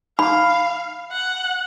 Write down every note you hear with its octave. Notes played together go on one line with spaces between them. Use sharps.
F5 B5
F#5